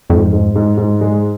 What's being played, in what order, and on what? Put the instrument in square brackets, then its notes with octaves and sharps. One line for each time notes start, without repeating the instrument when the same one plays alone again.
[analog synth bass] F2 [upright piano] G#2
[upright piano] G#2
G#2
G#2
G#3